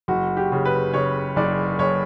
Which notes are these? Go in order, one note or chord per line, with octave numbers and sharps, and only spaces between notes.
F#1 F#4
G4
C#3
B4
C#3 C#5
F#1 D5
F#1 C#5